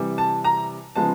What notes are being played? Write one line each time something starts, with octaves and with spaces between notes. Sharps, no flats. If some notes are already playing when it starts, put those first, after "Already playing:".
Already playing: C3 E3 G3
A5
A#5
C#3 F3 G#3 B3 A5